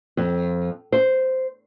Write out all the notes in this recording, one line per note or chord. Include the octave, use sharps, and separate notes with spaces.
F2
C5